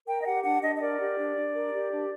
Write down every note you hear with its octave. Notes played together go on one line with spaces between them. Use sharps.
A#4 G5
D#5
G4 F#5
D4 F#5
D4 D#5
D#5
A#4 D5
G4
D4
D4
A#4
G4
D4